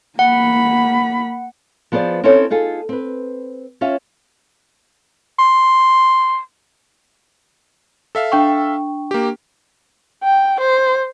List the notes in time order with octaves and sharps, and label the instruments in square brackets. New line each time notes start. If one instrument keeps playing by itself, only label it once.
[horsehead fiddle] A#3 B5 [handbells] F#5
[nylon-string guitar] F3 B3 G#4 C5 D5
C4 C#4 D#4 E4 A4 C#5
D#4 F4 G#4 A4
C4 B4
C#4 F4 C#5 E5
[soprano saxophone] C6
[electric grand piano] A4 E5 F5
[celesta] D4 G5 C#6
[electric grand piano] A#3 G4
[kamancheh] G5
C5